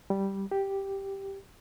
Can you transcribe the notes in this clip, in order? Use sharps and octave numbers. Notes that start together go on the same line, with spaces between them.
G3
G4